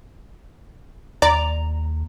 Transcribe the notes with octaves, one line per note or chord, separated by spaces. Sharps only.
D#2 D5 A#5